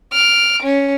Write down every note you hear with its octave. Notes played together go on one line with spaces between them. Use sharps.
F6 D7
C#4